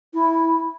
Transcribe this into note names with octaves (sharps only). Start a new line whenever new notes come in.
E4